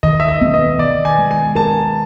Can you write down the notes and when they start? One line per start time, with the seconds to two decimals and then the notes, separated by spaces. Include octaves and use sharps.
0.03 D#3 D#5
0.20 E5
0.28 D#5
0.41 B3
0.54 D#5
0.79 D#3 D5
1.05 G#5
1.18 G#3
1.31 G#5
1.56 A#4 A5